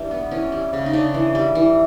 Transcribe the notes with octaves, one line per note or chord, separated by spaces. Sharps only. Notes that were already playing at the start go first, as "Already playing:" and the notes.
Already playing: E3 G3 D4 G4
B3
E3 C#4
G3
C#3
D#4
C#3 D4
E3
G3
E3